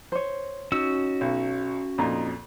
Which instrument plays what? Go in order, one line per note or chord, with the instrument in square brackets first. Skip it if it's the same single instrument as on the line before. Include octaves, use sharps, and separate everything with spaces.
[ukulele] C5 C#5
[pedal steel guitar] C#4 F#4 E6 [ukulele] D#4
[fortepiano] B1
[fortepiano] F2 A#2 [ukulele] D#4 A#5